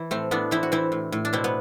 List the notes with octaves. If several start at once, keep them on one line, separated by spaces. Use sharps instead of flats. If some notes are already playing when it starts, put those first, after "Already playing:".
Already playing: E3
A2 A3 C4
A2 B3 D4
E3 C4 E4
F#4
E3 C4 E4
A2
A2
D4
B2 C4 E4
B3